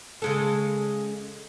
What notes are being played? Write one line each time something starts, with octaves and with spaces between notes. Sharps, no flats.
C#3 G#3 A4